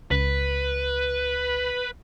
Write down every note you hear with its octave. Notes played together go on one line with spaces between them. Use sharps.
C#2 B4